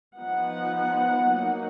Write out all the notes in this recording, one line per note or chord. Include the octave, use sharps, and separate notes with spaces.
F3 B3 D#4 F#5
F#3 A#3 D#4